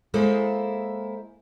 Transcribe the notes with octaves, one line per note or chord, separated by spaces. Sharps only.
G#3 A#3 E4 G#4 A4 C5